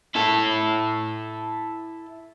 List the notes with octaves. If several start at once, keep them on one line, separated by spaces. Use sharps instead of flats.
E4 A4